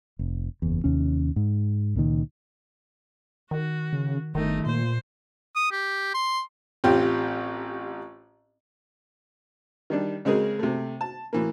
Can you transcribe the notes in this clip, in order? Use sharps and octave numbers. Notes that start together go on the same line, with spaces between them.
F1
F#1 E2
D#2 C3 C#4
G#2
C#2 A#2 D#3
D#3 F#4
C#3
G1 D#3 A3 D#4
A#2 C5
D#6
G4
C6
A1 C4 F4 G4
D#3 G3 D4
C#3 G#3 C4 G#4 A#4
C3 A3
A5
A2 E3 A#3